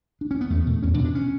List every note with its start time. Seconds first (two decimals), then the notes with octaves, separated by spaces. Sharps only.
0.21 D4
0.31 C#4
0.41 B3
0.50 E2 A3
0.66 B2
0.83 E2 C#4
0.94 D4
0.99 B2
1.04 D4
1.15 C#4